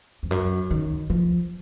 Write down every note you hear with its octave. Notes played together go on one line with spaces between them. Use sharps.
F2
F#2
D#3
F3